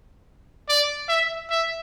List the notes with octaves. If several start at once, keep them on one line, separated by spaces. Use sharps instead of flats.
D5
E5
E5